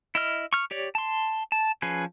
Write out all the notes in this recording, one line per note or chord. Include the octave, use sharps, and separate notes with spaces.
E4 D#5 F6
C#6 F6
G4 C#5 D5
A5 C6
A5
F3 C#4 G#4 B4